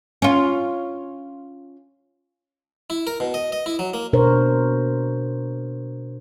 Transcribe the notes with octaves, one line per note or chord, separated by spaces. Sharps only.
C#4 F4
E4
A#4
B2
D#5
D#5
E4
F#3
A#3
B2 D4 A#4 C5 C#5